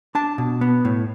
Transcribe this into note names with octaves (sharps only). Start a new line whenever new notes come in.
D4 A5
B2
B3
A2